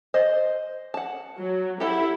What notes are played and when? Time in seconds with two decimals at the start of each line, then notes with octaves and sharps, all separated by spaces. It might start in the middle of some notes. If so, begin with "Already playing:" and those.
0.14 C5 D#5
0.94 F#5 A5
1.39 F#3
1.80 E4 G4 A4 F#5